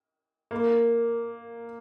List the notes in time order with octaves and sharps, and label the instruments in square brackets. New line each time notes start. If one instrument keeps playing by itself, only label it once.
[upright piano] A#3